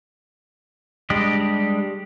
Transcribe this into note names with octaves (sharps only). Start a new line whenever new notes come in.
G3 G#3 D4 G4 D#5